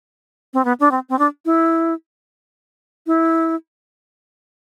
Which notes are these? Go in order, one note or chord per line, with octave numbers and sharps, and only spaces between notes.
C4
B3
D4
C4
C4
D4
E4
E4